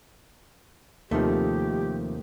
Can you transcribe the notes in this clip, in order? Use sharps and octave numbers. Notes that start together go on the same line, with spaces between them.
D#2 C3 D#3 F3 A3 G4